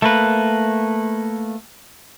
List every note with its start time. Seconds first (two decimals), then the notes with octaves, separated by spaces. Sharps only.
0.02 A3 A#3 B4